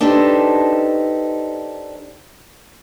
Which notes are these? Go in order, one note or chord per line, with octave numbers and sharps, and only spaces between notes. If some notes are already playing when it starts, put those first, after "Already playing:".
D4 D#4 G4 A4 B4 C5